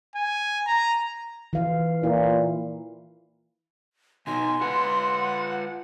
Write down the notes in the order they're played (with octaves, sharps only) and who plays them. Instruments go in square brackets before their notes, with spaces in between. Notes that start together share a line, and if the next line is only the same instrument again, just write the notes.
[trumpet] G#5
A#5
[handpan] E3 F5
[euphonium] A#2 [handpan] E4
[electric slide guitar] B2 D#4 [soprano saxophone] G#5 [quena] C6
[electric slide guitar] F4 B4 [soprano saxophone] F#5